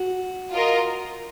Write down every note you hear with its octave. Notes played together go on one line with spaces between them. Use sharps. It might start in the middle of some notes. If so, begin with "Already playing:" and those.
Already playing: F#4
F4 A#4 D#5